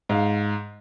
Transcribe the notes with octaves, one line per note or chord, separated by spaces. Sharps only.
G#2 F5